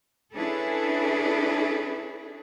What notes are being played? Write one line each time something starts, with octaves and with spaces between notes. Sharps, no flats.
C#4 D4 E4 G#4 A4 B4